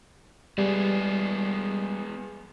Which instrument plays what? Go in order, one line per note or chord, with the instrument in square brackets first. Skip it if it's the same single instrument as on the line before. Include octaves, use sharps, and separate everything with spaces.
[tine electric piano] G3 [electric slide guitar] G#3 B3 G#4